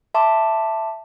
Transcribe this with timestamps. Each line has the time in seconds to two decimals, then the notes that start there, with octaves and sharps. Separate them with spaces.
0.14 E5 A5 C6 D6